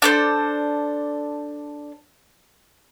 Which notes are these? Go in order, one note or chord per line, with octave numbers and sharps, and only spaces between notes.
D4 A4 C5